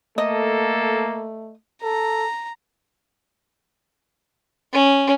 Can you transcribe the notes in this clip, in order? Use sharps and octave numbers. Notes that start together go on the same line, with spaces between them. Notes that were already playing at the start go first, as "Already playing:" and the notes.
A3 A#3 A4 D#5
A4 A#5
C#4